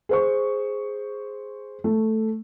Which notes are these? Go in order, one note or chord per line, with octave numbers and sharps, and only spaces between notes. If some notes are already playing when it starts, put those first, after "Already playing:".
G#4 C5 C#6
A3